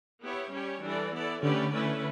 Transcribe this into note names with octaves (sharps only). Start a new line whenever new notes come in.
B3 E4 G4 C#5
G3 C#4 G4 C#5
E3 G3 D4 A4 D5
B3 E4 A4 D5
D3 A3 C#4 G4 B4 D5
A3 C#4 E4 B4